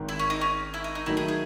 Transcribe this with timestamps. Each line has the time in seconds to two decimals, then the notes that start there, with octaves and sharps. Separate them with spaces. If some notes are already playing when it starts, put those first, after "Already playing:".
Already playing: G#1 G#2 D#3
0.09 E4
0.19 C#4
0.30 D#4
0.41 C#4
0.74 E4
0.84 D#4
0.95 D#4
1.06 D#3 F#3 A3 D#4 E4
1.17 G#4
1.28 G#4